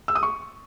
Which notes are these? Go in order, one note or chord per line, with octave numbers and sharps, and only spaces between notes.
E6
D#6
C#6